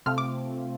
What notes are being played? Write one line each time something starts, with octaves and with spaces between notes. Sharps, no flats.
C3 A3 C4 F4 F6
D6